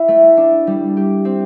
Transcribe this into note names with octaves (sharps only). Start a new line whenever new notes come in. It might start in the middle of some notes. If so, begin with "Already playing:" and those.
Already playing: E4
A3
D4
G3
G4
C4